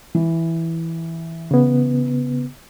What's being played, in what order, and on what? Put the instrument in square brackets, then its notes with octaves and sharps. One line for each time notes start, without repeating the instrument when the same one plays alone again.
[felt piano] E3
[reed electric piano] C#3 B3